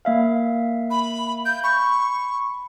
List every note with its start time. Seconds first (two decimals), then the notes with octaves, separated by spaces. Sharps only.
0.05 A#3 E5 F5
0.91 B5
1.46 G6
1.64 B5 C#6